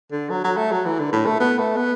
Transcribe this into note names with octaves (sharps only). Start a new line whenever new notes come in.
D3
F#3
F#3
A3
F#3
E3
D3
A2
A3
B3
A3
B3